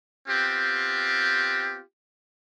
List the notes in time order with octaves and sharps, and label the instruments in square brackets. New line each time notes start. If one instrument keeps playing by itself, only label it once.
[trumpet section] B3 C4 F4 G4